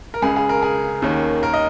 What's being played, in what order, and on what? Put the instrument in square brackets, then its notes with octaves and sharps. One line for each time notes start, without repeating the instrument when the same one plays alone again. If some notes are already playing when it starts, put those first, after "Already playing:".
[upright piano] A#4
C#2 C#3 G#3 G#4
G#4
A#4
G#4
D#2 D#3 A#3 C#4
A#4
D#5